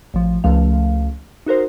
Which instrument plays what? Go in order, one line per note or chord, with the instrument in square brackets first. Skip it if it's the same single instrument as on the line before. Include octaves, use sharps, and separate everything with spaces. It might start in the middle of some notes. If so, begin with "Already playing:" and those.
[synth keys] A1 F3
C#2 F3 A3 F5
D#4 F#4 A#4 C5